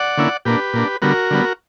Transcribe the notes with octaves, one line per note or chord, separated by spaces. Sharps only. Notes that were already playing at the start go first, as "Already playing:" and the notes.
Already playing: D5 F#5
D3 A#3 C#4 E4
A#2 A#3 D4 G4 B4
A#2 A#3 D4
D3 G3 B3 F#4 A#4
D3 G3 B3